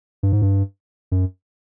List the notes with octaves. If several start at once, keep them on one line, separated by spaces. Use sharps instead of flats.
G2
G#2
G2
F#2